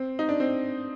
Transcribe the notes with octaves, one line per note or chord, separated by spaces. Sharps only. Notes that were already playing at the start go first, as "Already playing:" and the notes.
Already playing: C4
D#4
D4
C4